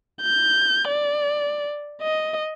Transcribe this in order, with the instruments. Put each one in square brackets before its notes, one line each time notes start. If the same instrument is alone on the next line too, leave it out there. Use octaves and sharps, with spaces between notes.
[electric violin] G6
D5
D#5